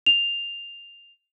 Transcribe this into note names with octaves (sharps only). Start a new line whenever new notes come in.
F7